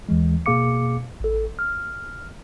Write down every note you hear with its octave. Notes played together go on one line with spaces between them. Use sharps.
D#2 E3 G#3
B2 A#3 G#4 F5 D6 C#7
A1 A4
F6